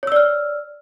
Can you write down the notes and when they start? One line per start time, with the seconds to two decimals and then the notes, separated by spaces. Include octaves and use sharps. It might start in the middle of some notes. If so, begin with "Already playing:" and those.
0.03 C#5
0.07 E6
0.12 D5
0.16 F6